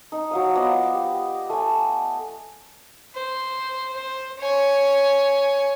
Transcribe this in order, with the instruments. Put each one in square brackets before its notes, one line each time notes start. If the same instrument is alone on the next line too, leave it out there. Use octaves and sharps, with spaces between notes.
[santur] D#4
F#3 F5 D#6
F3 B3 D5 D#5
G4
A3 G#5
[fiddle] C5
C5
C#5 G#5